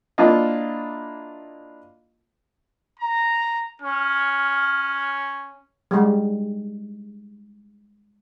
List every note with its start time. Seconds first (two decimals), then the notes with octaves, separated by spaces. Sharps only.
0.18 A#3 D4 E4 F4 D#5
2.99 A#5
3.82 C#4 F6
5.91 G3 G#3